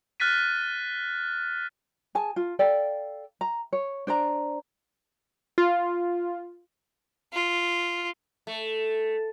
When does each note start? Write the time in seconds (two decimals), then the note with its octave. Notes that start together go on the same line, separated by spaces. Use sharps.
0.20 F6 F#6 A6 B6 D#7
2.15 G#4 G#5 A5
2.36 F4
2.59 A4 D5 F5 G5
3.41 A#5
3.73 C#5
4.07 D4 C5 D5 A#5
5.58 F4
7.33 F4
8.47 A3